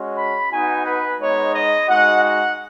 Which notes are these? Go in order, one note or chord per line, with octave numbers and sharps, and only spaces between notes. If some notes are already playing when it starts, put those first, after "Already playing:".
Already playing: G#3 C#4 F#4
B5
B3 D#4 F#4 G#5
B4
G#3 B3 D#4 C#5
D#5
G#3 D#4 F#4 F#5
F#5